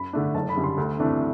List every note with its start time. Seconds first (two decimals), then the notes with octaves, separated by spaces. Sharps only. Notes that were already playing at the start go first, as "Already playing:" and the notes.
Already playing: F#2 B5
0.13 D3 A3 D4
0.34 F#1 A5
0.49 B5
0.56 F#2 D3 G3
0.64 C6
0.78 D2
0.99 C3 E3 A3 D4